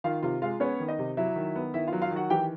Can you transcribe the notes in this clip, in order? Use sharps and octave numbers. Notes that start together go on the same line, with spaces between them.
D#3 F4 F5
C3 F4 F5
G#3 F4 F5
B3 C#4 C#5
D#3
D#4 D#5
C3
F#3 E4 E5
D#3
B3
D#3 E4 E5
F4 F5
F#3
F4 F5
D#3
F#4 F#5
E3 G4 G5